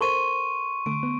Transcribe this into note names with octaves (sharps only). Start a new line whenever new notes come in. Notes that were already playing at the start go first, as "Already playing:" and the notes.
A4 A#4 C5 C6 C#6 D#7
D3 A3 D7
B3